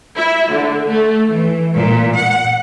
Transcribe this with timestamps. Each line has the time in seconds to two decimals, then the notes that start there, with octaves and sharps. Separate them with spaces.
0.15 E4
0.50 D3
0.87 A3
1.33 E3
1.76 A#2
2.17 F#5